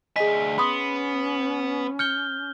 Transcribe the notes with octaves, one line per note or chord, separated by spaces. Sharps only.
D2 G#4 D#5 G#5 B6
B3 C#4 B5 C6 D#6
F6 G6 C#7 G7